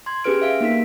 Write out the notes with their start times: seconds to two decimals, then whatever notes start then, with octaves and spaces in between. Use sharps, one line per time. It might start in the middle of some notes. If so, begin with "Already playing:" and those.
0.06 C6 G#6
0.24 C#4 G4 G#4 B4 F6 D7
0.41 E5 F5 D7
0.61 A#3 D#4 A#4 B6